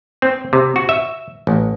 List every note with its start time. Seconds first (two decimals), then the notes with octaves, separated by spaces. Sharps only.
0.22 C4
0.53 C3
0.76 F#4
0.89 E5
1.47 A1